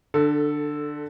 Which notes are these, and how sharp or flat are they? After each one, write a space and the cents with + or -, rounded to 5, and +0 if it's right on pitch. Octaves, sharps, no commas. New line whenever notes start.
D3 +15 A4 +0